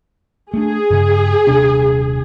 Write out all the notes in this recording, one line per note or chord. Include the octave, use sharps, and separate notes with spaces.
A3 D4 G#4
G2 C#3
D#1 C3 D4